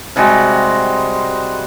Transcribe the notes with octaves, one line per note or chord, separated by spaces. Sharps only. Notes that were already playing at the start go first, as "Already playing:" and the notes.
C3 G3 G#3 F#4